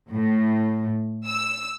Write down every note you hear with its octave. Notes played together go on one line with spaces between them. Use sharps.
A2
E6